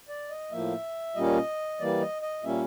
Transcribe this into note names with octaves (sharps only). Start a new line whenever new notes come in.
D5
D#5
A2 F3 A#3 E5
A#2 G3 A#3 C#4 D#5
E3 G3 A#3 D5
D#5
D#5
A#2 G3 A#3 C#4 E5